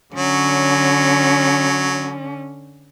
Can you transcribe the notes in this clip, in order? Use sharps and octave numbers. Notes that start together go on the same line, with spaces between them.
D3 F#3 C#4